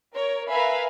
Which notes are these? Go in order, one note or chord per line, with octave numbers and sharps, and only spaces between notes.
A#4 C#5
A#4 B4 E5 F5 G#5 B5